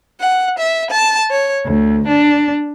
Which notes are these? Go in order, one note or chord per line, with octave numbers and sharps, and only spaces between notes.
F#5
E5
A5
C#5
D2
D4